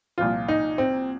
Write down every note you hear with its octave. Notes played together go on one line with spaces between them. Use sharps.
C2 A#2 F3 F4
D#4
C4